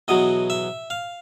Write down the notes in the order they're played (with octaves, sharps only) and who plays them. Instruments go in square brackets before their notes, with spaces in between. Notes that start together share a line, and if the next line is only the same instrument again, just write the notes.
[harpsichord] E2 B2 F#3 D#5
E5
F5